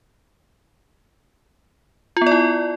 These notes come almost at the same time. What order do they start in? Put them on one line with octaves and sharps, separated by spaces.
F4 B3 D5 E4